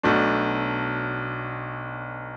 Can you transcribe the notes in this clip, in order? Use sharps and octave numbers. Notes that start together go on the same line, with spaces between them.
B1 B2 A3 D4